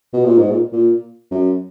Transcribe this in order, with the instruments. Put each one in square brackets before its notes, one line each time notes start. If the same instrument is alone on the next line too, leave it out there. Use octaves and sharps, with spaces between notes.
[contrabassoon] B2
A#2
G#2
A#2
A#2
F#2